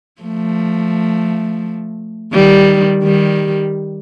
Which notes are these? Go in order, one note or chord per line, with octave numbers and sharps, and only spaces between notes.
F3 A3
D#3 G3
D#3 G3